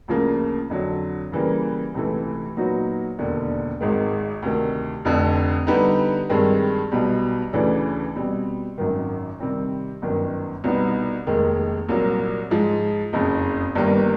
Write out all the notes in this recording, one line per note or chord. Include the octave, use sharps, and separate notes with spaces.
D2 C#3 F3 A#3
F2 D3 F#3
C#3 E3 G3 A#3
C#2 C3 E3 A3
A#2 F#3 B3 D#4 F#4
E1 D#2 D3
G#1 G#2 D#3 G#3
D2 C3 D#3
F1 F2 D3
D3 G3 B3 D#4 G4
G2 D#3 G#3 C4
B1 B2 G3
D2 C#3 E3 A3 D4
B2 G3 C4
G#1 F#2 D#3
C3 D#3 G3 C4
G1 F#2 D#3
C2 B2 G3 B3 D#4
F1 D#2 D#3 G#3
C2 A#2 F#3 A#3
G#2 F3 G#3
F#1 F2 C#3
G1 G2 D#3 G3 A#3